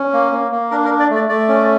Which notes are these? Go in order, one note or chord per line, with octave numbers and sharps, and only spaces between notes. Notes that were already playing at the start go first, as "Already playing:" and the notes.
Already playing: C#4
A#3
A#3
A#3
D4 A#4
A#4
D4
D5
A3 D5
A3 D5
C#4